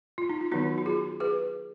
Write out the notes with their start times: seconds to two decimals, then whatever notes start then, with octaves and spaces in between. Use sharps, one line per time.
0.18 F4
0.29 D#4
0.41 F4
0.52 D#3 F#3 B3 D#4 F#4
0.78 F#4
0.86 F4 G#4
1.20 G#4 B4